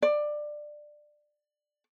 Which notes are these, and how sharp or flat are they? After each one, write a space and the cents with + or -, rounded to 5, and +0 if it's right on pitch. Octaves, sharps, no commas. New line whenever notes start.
D5 +15